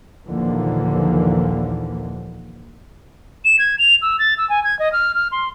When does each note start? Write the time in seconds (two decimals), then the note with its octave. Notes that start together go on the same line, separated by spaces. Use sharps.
0.26 A#1 D#2 D3 E3 F3 A#3
3.45 E7
3.59 G#6
3.79 F7
4.02 E6
4.19 A6
4.38 E6
4.50 G#5
4.64 G#6
4.79 D#5
4.93 F6
5.15 F6
5.32 C6